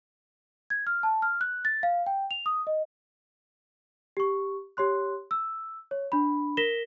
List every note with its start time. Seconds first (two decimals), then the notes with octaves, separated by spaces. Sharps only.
0.70 G#6
0.87 F6
1.03 A5
1.22 F6
1.41 F#6
1.65 A6
1.83 F5
2.06 G5
2.31 F7
2.46 D#6
2.67 D#5
4.17 G4 C#6
4.77 G4 C#5 C6 F#6
5.31 E6
5.91 C#5
6.12 D4 B5
6.57 A#4 A#6 B6 E7 G7